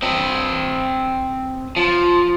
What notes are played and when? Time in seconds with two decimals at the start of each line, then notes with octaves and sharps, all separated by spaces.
0.02 C4 D#5
1.76 F3